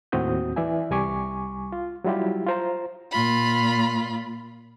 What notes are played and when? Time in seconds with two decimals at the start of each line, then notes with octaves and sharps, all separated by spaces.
0.12 D#2 A2 C4 F#4 D#6 G6
0.56 E3 D5 E5 G#5
0.91 C2 G3 G#5 C#6 D6
1.72 F4
2.04 F#3 G3 E4 F4 G4
2.47 F4 C5 A#5
3.11 A#2 F4 B5